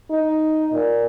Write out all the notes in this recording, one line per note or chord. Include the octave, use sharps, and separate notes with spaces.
D#4
A#2